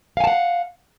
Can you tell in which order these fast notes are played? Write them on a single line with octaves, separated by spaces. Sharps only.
F5 G#5 A5 F#5